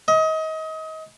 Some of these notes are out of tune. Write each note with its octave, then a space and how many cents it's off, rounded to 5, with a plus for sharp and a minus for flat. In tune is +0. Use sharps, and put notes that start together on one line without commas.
D#5 +30